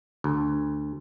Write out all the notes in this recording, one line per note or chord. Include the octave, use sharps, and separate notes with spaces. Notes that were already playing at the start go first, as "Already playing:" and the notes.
D2